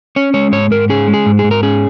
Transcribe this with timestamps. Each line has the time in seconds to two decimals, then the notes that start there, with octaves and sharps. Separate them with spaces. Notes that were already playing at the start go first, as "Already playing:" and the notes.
0.16 C#4 C#5
0.34 G#3 C#5
0.52 G#2 C#5
0.71 G#2 A#4
0.89 C#4 G#4
1.08 G#3
1.14 G#4
1.26 G#2
1.39 G#4
1.44 G#2
1.51 A#4
1.63 C#4 G#4